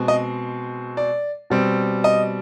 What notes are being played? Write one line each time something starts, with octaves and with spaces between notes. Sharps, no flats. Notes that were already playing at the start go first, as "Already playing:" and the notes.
Already playing: B2 G#3 C4
D#5
D5
B2 G3 C4
D#5